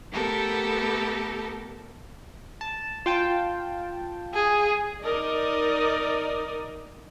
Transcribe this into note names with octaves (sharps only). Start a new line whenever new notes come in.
A3 B3 G4 A4 A#4
A5
F4 G5 A5
G#4
D#4 A#4 D5 D#5